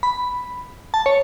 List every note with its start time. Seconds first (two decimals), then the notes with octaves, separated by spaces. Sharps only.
0.03 B5
0.94 A5
1.06 C#5